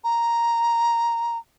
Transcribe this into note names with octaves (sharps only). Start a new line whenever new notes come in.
A#5